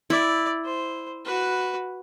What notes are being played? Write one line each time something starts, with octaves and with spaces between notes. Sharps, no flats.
E4 D5
C5
F#4 B4